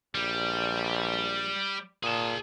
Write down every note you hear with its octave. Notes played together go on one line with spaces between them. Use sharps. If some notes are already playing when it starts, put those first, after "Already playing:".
A#1 G3
A#2 G#4 A5